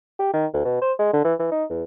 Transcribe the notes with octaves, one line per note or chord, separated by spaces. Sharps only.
G4
D#3
D2
B2
C5
G#3
D3
E3
E3
D#4
E2